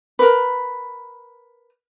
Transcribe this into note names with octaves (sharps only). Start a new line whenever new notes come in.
A#4 B4